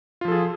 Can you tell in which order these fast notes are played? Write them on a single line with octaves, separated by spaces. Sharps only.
F4 F3 A4 G#4